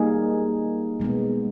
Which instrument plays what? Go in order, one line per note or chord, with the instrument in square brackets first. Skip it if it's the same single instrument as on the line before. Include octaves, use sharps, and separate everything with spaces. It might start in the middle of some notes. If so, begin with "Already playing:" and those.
Already playing: [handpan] G3 A#3 D#4 G#4
B2 G#3 B3